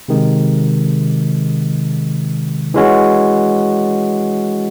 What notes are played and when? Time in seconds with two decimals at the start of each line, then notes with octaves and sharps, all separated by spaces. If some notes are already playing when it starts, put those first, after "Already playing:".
0.08 C3 D#3 G#3
2.74 E3 G#3 C#4 F#4